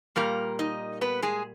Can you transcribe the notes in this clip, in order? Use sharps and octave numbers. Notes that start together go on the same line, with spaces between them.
A#2 G3 A#3 A#4 A#5
D#4 D#5
B3 B4
G#3 G#4